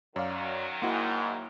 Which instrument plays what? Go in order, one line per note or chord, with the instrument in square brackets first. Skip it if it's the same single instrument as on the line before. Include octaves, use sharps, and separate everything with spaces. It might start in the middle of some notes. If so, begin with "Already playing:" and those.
[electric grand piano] F#2 [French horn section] D#3 F#3 [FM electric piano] C#5 D5 F5
[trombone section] G#2 [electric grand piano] A#3 E4 [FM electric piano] F#4 F#5 C6